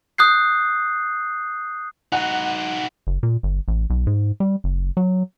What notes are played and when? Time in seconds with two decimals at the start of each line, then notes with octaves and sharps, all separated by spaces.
0.18 D#6 F#6 G6 C7
2.12 D#4 F#4 F#5
3.07 F#1
3.23 A#2
3.43 G1
3.68 A1
3.90 B1
4.07 G#2
4.40 G3
4.64 F#1
4.97 F#3